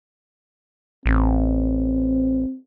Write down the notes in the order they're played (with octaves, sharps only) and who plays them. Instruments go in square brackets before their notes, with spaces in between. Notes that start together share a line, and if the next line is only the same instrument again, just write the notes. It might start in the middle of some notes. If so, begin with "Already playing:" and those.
[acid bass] A1 [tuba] C4